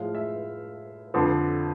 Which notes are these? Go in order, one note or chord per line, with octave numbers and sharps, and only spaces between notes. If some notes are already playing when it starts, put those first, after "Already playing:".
Already playing: A2 F3 G#3 F5
E5
F2 D3 F3